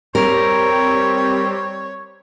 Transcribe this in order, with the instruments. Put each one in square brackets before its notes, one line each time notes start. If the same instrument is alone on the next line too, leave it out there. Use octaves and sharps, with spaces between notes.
[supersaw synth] G3 C4 G4 [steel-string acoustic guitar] A#4 [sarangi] C#5